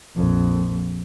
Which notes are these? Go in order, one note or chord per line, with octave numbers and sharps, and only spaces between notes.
A#1 F2